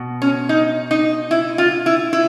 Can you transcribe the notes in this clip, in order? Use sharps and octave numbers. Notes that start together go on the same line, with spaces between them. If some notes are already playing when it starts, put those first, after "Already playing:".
Already playing: B2
C#4
D#4
D#4
E4
F4
E4
E4